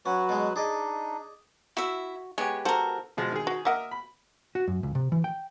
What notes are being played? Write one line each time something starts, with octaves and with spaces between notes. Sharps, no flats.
F#3 C#4 F#4 B4
B2 G#3
D4 D#4 G#4 D5 D#5
E4 F#4 E5
G#3 B3 G4 C#5 G#5
F#4 A4 A#4 C5
B2 F3 G#3
D#3 G#4
F#4
A#3 A#4 D#5 E5 F#5
B5
F#4
F#2
C#2
C3
E3
G5